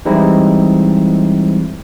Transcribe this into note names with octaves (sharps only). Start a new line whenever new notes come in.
E3 G3 G#3 C4 D#4 E4